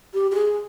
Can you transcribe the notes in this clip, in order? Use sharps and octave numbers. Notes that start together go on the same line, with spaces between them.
G4
G4
G#4